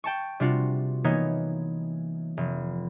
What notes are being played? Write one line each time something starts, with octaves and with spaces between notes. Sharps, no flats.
G5 A5 C#6
C3 G3 D4 F4 F#4
E3 A#3 B3 D#4 C#5
F1